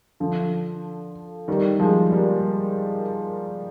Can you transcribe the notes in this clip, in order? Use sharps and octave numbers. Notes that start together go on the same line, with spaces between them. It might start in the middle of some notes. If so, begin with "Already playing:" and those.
D3 F3
D#3 G3
F3 G#3
G3 A#3